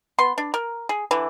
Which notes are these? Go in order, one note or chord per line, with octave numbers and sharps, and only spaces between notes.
B3 C6
D4
A#4
G#4
D3 E3